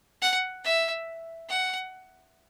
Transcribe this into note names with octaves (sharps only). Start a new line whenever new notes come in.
F#5
E5
F#5